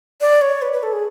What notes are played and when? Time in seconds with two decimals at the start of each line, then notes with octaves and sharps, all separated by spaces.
0.21 D5
0.41 C#5
0.62 B4
0.73 B4
0.83 A4
0.93 G#4